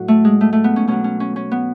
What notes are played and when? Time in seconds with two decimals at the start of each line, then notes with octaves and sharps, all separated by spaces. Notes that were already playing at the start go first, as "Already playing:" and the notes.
Already playing: A2 F#3 F#4
0.08 A3
0.25 G#3
0.41 A3
0.53 A3
0.64 B3
0.76 C#4
0.87 B2 F#3 C#4
1.04 C#4
1.20 C#4
1.36 C#4
1.51 B3